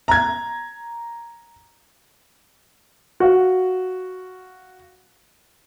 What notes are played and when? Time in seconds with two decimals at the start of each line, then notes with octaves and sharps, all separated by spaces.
0.08 A#5 G#6
3.20 F#4 F5